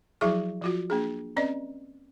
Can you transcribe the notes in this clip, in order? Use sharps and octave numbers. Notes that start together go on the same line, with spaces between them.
F3 F#3 E4 F#4 G#4 C#6
F3 F4 F#4
A#3 D4 G#4
C4 C#4 B4 D5 D#5